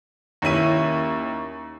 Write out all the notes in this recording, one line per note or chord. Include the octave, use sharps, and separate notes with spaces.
D#2 C#4 E4 D#7